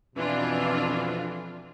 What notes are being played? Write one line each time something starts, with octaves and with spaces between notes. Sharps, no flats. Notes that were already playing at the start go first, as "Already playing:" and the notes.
F2 B2 E3 D4 F4